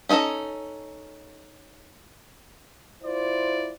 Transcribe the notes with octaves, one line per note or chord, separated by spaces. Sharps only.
C#4 D#4 G#4 A4 D#5
E4 F4 C5 D5